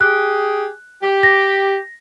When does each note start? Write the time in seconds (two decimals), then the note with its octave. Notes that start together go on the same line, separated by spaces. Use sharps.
0.01 G4 G#4 F#6
1.03 G4
1.23 A#6